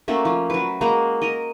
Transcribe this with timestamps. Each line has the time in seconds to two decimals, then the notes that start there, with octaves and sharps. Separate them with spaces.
0.08 A3 A#3 C#4 F#4
0.25 F3
0.50 F#3 B4
0.81 G#3 A#3 F#4 A#5
1.22 A#4 D#5